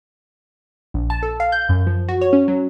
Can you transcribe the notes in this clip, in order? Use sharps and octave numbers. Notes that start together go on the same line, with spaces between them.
A#1
A5
A4
F5
G6
F#2
F3
F#4
C#5
C#4
F#3